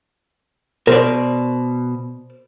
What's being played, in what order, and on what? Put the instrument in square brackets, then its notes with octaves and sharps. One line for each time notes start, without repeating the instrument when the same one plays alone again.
[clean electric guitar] B2 [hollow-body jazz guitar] A#4 C5 D5